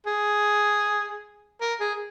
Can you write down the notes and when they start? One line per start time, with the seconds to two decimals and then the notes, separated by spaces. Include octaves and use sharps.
0.06 G#4
1.61 A#4
1.80 G#4